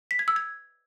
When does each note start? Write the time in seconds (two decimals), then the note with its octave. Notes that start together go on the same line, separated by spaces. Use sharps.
0.11 B6
0.19 G#6
0.28 E6
0.36 G#6